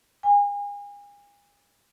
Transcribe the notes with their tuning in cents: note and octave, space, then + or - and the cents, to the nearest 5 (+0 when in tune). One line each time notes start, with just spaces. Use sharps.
G#5 -35